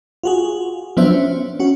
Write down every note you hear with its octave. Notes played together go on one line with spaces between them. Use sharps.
F4 F#4 G#4
F3 F#3 B3 D4 C5 E5
C#4
C#4 F#4